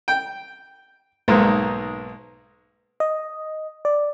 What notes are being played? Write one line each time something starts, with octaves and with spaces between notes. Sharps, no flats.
G5
B1 G#2 G#3 A#3
D#5
D5